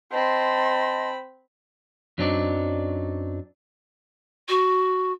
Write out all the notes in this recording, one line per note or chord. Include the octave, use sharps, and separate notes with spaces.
C4 D#5 A5 B5 C6
F#2 F#3 C4 D4 D#4 D5
F#4